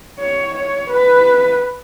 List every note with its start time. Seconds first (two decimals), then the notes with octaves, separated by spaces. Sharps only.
0.19 C#5
0.55 C#5
0.90 B4